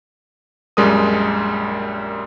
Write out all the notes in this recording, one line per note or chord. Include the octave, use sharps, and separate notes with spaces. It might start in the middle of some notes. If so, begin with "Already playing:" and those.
A#1 F#2 G3 G#3 A#4 D#6